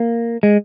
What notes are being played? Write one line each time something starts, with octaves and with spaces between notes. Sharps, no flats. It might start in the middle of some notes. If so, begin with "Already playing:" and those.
Already playing: A#3
G#3